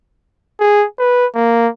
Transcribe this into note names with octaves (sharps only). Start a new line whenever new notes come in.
G#4
B4
A#3